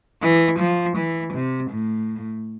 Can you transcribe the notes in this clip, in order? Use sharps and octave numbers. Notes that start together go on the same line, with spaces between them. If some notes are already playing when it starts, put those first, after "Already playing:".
E3
F3
E3
C3
A2